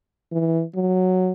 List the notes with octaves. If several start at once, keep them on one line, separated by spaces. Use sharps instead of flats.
E3
F#3